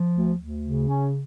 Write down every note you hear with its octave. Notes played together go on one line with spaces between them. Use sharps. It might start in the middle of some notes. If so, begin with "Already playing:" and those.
Already playing: F3
D2
D2
C#3
C#4